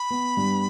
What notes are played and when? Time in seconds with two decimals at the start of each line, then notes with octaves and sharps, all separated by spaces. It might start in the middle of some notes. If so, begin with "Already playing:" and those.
Already playing: B5
0.10 B3
0.37 G2